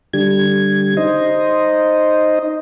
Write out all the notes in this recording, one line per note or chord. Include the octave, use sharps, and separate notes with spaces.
D3 G3 G#6
D#4 C5 D#5